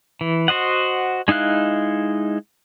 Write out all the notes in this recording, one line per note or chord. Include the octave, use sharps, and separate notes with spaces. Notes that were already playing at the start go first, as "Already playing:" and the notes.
E3
F#4 C5 D#5 F#5
G#3 D#4 E4 F5 F#6